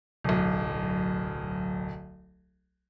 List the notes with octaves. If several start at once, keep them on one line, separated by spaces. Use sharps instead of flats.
D1 B1